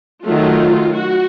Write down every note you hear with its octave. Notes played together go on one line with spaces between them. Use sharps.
D#3 F#3 A3 F4
F#4